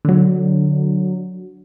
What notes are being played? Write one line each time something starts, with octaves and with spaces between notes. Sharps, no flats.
D3 F#3